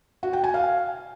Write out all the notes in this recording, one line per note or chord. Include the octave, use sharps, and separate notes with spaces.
F#4
G5
G#5
F5